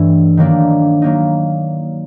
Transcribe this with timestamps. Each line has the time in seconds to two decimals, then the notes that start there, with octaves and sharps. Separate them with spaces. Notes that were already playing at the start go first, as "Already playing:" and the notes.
Already playing: G2 E3 A3
0.37 D#3 F#3 A#3 D4
1.02 F#3 A#3 D#4